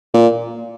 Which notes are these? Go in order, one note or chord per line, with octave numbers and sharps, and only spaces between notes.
A#2